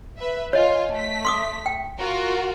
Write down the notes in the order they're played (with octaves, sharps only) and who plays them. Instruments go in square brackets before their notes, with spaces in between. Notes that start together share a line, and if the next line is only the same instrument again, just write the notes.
[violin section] B4 E5
[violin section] F4 G#5 [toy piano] C#5 D#5
[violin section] A3 B6
[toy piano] C6 D6 D#6
G5
[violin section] F4 F#4 A#4